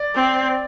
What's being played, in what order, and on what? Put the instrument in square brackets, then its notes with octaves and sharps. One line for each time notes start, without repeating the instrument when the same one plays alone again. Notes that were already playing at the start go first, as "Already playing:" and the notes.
Already playing: [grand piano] D5
[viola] C4